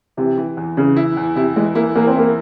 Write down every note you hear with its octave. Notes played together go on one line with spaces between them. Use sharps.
C3 E3
E3
E2
C#3 E3
E4
E2
C3 E4
E3 G#3
A#3 E4
E2 A#3
C4
A#3 E4